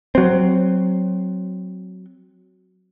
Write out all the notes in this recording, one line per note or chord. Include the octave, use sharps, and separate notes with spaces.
F#3 C4